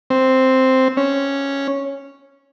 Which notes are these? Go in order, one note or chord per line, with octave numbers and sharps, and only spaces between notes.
C4
C#4